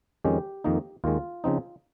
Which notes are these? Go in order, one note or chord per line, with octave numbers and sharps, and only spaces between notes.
F2 D#3 G#3 C#4 G4
F2 D#3 A#3 D#4
D#2 D#3 G#3 F4
C#3 F3 C4 D#4